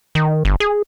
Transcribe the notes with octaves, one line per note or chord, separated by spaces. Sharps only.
D#3
G1
G#4